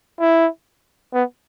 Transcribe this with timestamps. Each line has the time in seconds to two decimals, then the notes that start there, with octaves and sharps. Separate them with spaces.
0.20 E4
1.14 B3